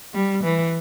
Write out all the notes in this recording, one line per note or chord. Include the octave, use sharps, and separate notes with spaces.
G3
E3